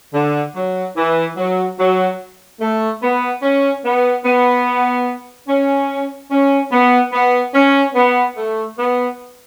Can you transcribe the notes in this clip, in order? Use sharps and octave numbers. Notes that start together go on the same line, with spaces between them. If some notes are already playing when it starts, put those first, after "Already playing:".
D3
F#3
E3
F#3
F#3
A3
B3
C#4
B3
B3
C#4
C#4
B3
B3
C#4
B3
A3
B3